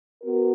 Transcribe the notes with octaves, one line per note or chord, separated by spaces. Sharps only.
B3 F#4 A#4